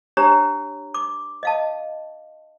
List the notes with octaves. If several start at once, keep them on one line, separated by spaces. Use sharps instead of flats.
D4 G4 C#5 A#5
D6
D#5 F5 A5